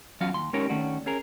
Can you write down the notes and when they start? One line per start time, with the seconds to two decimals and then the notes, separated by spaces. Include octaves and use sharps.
0.20 E2 F#3 C#4 F4 F#4 F5
0.34 D#2 C6
0.53 G#3 C#4 D#4 G4 A#4 C#5
0.69 D#3 A3 C#4 D4 F#4
1.06 C#4 G#4 A#4